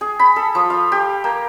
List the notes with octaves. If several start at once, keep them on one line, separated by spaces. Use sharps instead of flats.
G#4
B5
A4
F3
F5
G4
A#3